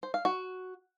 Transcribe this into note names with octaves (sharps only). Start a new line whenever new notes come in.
C5
F5
F#4